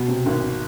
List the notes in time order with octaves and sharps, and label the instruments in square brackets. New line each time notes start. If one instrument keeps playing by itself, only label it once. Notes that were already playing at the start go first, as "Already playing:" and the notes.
Already playing: [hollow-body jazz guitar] B2
[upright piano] C3
G#1